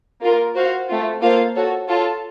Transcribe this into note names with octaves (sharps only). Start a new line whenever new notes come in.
A#3 F4 A#4
F#4 C5 F5
A3 C4 F4
A#3 F4 A4 C5 F5
F#4 A4 C#5
F4 A4 C#5 A5